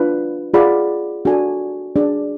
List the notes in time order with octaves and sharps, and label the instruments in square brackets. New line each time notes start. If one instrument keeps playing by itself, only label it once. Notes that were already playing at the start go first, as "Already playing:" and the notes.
Already playing: [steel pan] D4 F4 B4
F4 G#4 D5 F#5 B5
D4 F#4 A4 D5 G#5
D4 G#4 D5